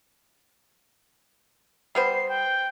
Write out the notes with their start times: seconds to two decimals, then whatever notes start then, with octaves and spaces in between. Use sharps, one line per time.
1.95 G3 B3 C5 C7
2.29 G5